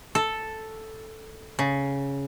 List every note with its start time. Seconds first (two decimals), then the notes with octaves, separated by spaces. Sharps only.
0.15 A4
1.59 C#3